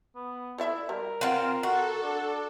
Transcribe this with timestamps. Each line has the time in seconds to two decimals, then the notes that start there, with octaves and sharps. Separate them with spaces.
0.15 B3
0.58 E4 A4 D5 E5
0.89 G3 A#4
1.21 C4 F4 B4 F5 F#5
1.63 F#4 A4
2.03 D4